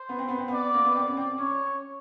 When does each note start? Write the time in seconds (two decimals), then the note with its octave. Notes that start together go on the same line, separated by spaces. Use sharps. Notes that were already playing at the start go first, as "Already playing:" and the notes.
Already playing: C5
0.09 B3
0.19 C4
0.28 B3
0.38 C4
0.48 B3 D5
0.74 A#3
0.85 B3
0.95 C4 D5
1.08 C#4
1.17 C4
1.38 C#4 C#5